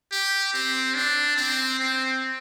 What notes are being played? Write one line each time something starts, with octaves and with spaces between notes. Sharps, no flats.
G4
C4
D4
C4
C4